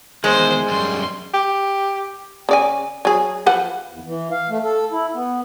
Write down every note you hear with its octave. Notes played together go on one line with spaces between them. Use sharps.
E2 D#3 G#3 C5
F#2 G3 C6
G4
C#3 D5 G#5
F#3 G#4
F3 B4 F#5
E2
E3
F5
A3
A4
E4
B3